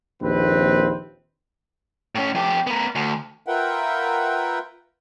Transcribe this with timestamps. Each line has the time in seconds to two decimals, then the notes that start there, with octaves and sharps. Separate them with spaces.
0.22 A#1 D#2 C4 B4
2.15 A2 C#4
2.35 F2 G4
2.67 B3 A#4
2.95 D2
3.46 F4 A#4 B4 E5 F#5 G5